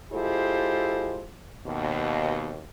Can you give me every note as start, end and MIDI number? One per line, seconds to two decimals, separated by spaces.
0.13 1.26 56
0.13 1.26 64
0.13 1.26 65
0.13 1.26 67
0.13 1.26 69
0.13 1.26 72
1.67 2.61 39
1.67 2.61 47